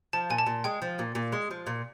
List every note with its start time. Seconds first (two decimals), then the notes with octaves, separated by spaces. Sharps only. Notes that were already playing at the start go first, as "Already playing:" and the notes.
0.13 F3 A5
0.30 A#2 G#5
0.38 A5
0.46 A#2
0.64 G#3 G5
0.82 F3
0.99 A#2
1.15 A#2
1.32 G#3
1.51 F3
1.67 A#2